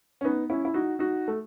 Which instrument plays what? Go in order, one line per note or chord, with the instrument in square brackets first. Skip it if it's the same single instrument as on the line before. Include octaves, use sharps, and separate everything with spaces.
[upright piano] C#4
B3 D#4
C#4 E4
E4
D#4 F#4
D#4 F#4
A3